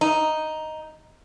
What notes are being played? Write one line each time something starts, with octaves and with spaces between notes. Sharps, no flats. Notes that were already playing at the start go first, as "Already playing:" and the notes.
D#4